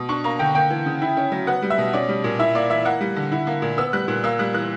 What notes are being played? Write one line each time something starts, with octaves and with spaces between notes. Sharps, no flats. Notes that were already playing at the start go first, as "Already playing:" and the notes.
Already playing: B2
D4 C#6
A#3 A#5
D3 G5
A#3 G5
E3
C#3
E4
C#4
F#3
B3 F#5
G3
E5
B2
C#4 D5
G3
A#2
E4 E5
A#3 D5
E3 E5
A#3 F#5
G3
D3
E4
A#3
A#2
B3 E6
G3 F#6
A#2
A#3 E6
G3 F#6
E3 F#6